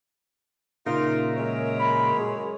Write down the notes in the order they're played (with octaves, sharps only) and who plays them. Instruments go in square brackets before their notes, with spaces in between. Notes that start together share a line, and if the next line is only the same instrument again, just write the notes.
[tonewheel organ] A#2 C#3 A#4 [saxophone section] D#4 F4 [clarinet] E5
[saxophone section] F#2 G#3 C#5
[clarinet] B5
G#4